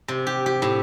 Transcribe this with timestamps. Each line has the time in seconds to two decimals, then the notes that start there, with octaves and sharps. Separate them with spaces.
0.08 C3
0.27 G4
0.46 G4
0.62 A2